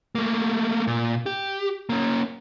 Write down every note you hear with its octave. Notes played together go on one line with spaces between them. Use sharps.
A3 A#3
A#2
G4
A#3 C#4